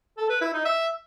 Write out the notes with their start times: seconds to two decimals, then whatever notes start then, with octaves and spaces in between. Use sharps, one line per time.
0.18 A4
0.30 B4
0.42 E4
0.54 D#4
0.65 E5